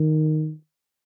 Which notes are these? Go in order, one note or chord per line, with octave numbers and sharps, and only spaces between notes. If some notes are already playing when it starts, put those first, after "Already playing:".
Already playing: D#3